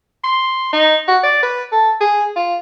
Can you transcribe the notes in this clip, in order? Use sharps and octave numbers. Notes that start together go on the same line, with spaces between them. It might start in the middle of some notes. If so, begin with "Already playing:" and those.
C6
D#4
F#4
D5
B4
A4
G#4
F4